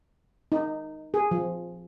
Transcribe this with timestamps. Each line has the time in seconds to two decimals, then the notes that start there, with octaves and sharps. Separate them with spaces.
0.52 D#4
1.14 G#4
1.31 F3